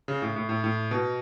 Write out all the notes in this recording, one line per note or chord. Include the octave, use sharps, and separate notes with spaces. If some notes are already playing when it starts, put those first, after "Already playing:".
C#3
A2
A2
A2
A2
B2